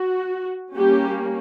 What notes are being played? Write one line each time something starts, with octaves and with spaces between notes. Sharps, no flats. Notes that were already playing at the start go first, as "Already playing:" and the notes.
Already playing: F#4
G3 A#3 C#4 G4